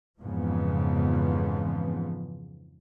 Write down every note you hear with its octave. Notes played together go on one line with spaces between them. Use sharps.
F2 G#2 C#3 E3 F3 B3